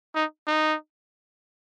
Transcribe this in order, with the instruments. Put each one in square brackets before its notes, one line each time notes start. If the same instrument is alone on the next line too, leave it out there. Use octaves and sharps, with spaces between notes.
[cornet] D#4
D#4